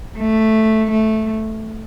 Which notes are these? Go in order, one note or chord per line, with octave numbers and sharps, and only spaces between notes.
A3
A3